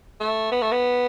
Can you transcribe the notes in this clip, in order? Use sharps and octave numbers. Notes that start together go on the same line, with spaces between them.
A3
B3
A3
B3